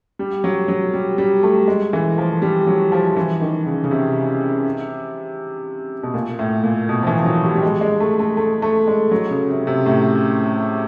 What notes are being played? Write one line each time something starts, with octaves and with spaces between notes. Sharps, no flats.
G3
F#3
F#3
G3
G3
A3
G#3
E3
F3
G3
F#3
F3
E3
D#3
C#3
C#3
C3
B2
A#2
A2
A#2
B2
F3
E3
F3
F#3
G3
G3
G#3
G#3
A3
A3
A3
A3
G#3
F#3
C#3
C3
C3
A2